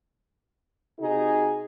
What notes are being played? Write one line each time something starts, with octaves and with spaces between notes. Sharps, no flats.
C3 D#4 F#4 G#4